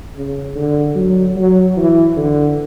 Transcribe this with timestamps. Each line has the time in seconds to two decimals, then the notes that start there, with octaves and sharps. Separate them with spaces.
0.16 C#3
0.56 D3
0.96 F#3
1.36 F#3
1.77 E3
2.17 D3